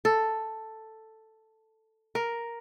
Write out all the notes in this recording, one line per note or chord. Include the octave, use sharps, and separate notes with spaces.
A4
A#4